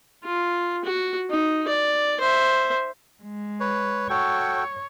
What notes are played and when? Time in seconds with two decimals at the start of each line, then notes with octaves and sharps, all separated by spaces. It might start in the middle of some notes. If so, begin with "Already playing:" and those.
0.24 F4
0.84 F#4
1.31 D#4
1.68 D5
2.20 C5 E5
3.23 G#3
3.60 B4 C#5
4.10 F#4 A4 C#5 G5